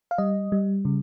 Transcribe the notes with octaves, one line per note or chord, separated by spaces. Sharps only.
F5
G3 D#5
G3
C#3